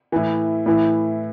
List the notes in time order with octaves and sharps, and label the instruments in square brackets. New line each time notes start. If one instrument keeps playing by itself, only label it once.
[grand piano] A2 E3
A2 E3